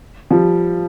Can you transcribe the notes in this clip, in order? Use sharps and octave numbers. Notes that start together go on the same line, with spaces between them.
F3 G3